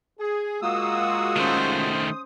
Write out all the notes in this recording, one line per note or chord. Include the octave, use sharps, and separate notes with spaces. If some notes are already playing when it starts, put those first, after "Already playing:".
G#4
G#3 A#3 F4 F#4 D#6 E6
D#3 A3 C#4 C5
D#6